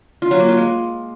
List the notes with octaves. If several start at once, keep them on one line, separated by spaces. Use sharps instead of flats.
F4
F#3
A#3
F4
G#3